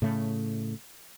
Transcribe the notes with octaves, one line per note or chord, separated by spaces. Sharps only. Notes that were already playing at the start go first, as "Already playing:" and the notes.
A2 C#3 A3